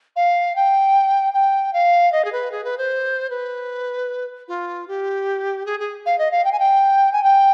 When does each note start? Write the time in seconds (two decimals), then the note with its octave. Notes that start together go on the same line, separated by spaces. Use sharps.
0.16 F5
0.56 G5
1.34 G5
1.73 F5
2.12 D#5
2.25 G#4
2.32 B4
2.52 G#4
2.64 B4
2.78 C5
3.30 B4
4.48 F4
4.88 G4
5.66 G#4
5.80 G#4
6.06 F5
6.19 D#5
6.31 F5
6.45 G5
6.52 G#5
6.59 G5
7.13 G#5
7.23 G5